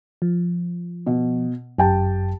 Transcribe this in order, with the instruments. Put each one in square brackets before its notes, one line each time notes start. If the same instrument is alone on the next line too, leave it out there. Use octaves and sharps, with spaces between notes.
[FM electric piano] F3
[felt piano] B2
[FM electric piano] G1 F#2 [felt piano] G4 G5 A5